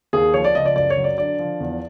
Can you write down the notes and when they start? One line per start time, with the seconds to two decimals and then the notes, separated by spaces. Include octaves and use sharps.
0.13 D#2 G#4
0.34 F3 C#5
0.45 D5
0.55 C#2 D#5
0.66 D5
0.76 F#2 D5
0.90 C#5
0.97 F#3
1.04 D5
1.18 D3 D5
1.39 F3
1.60 E2